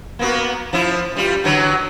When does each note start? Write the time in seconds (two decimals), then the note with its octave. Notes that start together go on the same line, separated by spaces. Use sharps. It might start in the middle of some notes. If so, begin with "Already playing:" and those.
0.19 A#3 B3 F#4
0.73 F3 E4
1.15 E3 G3 F4
1.44 D3 E3 F#3